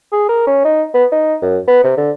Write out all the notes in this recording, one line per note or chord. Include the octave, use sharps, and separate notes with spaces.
G#4
A#4
C#4
D#4
B3
D#4
F#2
B3
C3
D3